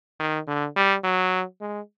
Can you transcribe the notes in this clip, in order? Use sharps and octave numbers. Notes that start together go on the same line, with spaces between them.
D#3
D3
G3
F#3
G#3